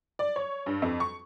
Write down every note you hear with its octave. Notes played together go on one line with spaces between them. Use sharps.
D5
C#5
G2
F2
C#6